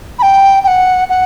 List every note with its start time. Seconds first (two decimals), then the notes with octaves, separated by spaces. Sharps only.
0.19 B5
0.22 G5
0.64 G5
0.68 F#5
1.09 F#5